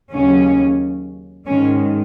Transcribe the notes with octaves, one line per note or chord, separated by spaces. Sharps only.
D#2 C#3 F#3 C#4
G#2 D#3 G#3 C#4